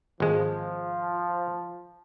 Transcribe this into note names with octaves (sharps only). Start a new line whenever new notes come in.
G#1 F3 G#3